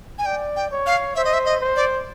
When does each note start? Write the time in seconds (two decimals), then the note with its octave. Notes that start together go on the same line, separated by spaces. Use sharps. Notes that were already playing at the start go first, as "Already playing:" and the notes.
0.18 G#5
0.25 D5 G5
0.56 G5
0.71 C#5
0.86 F5
1.16 C5 E5
1.25 D#5
1.33 E5
1.45 D#5
1.61 C5
1.76 D5